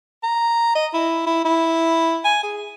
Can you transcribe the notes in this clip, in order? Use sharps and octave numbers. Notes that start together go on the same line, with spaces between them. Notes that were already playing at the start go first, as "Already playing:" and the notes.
A#5
D#5
E4
E4
E4
G#5
G#4